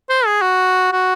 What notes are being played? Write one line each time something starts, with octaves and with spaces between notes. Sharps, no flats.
C5
G#4
F#4
F#4